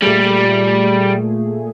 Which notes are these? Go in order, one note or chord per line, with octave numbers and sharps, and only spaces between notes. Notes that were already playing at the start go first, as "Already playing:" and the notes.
A#2 G3 A3 G#4